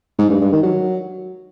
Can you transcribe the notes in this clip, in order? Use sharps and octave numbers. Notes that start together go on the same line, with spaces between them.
G#2
G2
G2
D#3
F#3